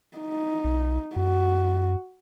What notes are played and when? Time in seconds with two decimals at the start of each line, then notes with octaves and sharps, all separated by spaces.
0.18 D#4
0.64 B1
1.16 F#2 F#4